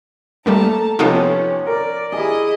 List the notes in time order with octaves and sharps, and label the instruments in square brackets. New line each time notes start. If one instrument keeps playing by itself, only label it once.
[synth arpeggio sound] G3 A3 A#3 [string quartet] A4 A5 A#5
[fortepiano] C3 F3 B3 [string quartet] C#4 [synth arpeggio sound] D#4 F4 A4
[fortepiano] A#4 [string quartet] D5
[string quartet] E4 D#5 [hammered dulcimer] G#4